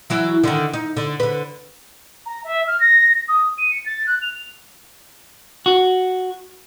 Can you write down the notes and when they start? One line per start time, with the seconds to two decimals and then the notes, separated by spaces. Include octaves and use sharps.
0.10 E3 F#3 E4
0.44 D3 D#3
0.73 D#4
0.97 D3
1.20 D3 B4
2.26 A#5
2.44 E5
2.67 F6
2.80 A#6
3.28 D#6
3.58 D#7
3.71 C#7
3.86 A6
4.07 F#6
4.22 F7
5.66 F#4